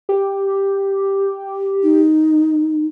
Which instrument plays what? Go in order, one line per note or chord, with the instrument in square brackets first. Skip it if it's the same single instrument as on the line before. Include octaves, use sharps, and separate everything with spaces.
[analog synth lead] G4
[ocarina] D#4